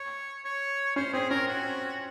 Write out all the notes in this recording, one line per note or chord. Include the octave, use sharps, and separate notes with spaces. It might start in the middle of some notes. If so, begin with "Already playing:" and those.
Already playing: C#5
C#5
C#4 C5
C4 G#4
C#4 A#4
F#4